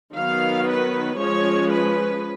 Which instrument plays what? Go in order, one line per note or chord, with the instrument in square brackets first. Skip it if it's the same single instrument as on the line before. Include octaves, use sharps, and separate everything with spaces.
[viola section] D#3 F#3 B3 F5
B4
F3 G#3 C#4 C#5
B4